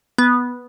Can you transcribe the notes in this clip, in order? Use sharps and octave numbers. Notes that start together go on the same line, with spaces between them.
B3